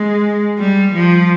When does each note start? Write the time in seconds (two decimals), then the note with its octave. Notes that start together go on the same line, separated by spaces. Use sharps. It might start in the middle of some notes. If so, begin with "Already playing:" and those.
Already playing: G#3
0.59 G3
0.94 F3